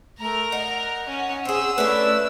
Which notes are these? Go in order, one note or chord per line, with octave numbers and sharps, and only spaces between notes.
A3 A#4 A#5
D#4 F#5
C#4
C4 G#4 E6
A3 C#4 D4 E4 B4